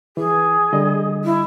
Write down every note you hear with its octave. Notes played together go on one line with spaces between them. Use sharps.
E3 G#4
D3 G3 D#5
E4